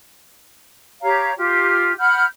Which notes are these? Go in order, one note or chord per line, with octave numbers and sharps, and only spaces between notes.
G4 C#5 F5 A#5
F4 G4
F#5 B5 F6 G6